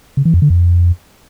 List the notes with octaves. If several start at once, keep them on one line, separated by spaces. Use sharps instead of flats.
C#3
E3
F2
D3
F2